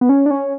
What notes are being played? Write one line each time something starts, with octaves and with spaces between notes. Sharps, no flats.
B3
C#4
D4
C#4